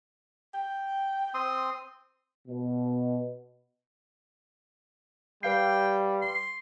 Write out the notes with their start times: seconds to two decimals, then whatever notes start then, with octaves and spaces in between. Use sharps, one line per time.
0.54 G5
1.34 C4 C6 D#6
2.48 B2
5.43 G3 B4 F5 G5 C7
6.22 C6